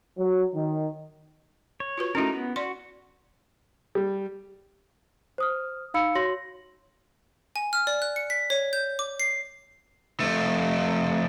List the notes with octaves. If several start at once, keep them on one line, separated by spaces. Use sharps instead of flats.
F#3
D#3
C#5
F4 F#4 B4
A3 C#4 D#4 E4 F#4 A#4
B3
F#4 D5 C6
G3
C5 D#6 F6
D#4 F5 B5 E6 C#7
F#4 C#5 C6 A#6 F#7
G#5
F6
D5
F#6
C#7
B6
C#5
G6
D6
C7
F2 A3